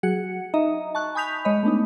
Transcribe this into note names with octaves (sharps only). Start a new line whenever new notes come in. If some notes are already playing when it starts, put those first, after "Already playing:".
F#3 F#4 G#4 F#5 C#7
D#4 D#5 E5 A#5
A5 C#6 F#6
G#5 B5 D#6 G6 B6 F7
G#3 C#5 D#5 B5
A3 B3 D4 D#4